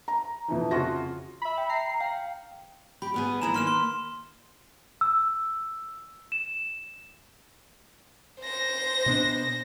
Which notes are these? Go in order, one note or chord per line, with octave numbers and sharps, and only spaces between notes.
A#5
F2 A#2 E3 F3
F2 C#3 F3 F4 F#4 A#6
E5 B5
G5
A#5 C7
F5 G5
G4 B5
G3 B3 G#4
E3 E4 A#5 E7
D#3 A#3 B4 C6 F6 E7
C6
E6
E7
C5 A#6
B2 B3 D4